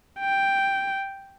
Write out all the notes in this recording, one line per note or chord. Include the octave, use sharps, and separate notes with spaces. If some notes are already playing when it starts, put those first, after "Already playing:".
G5